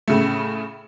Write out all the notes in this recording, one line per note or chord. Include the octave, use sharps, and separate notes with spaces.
A2 C#3 A3